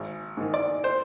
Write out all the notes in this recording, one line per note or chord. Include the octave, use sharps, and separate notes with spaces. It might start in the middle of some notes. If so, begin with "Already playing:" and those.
Already playing: G#1
G#2 D#3
D5
C5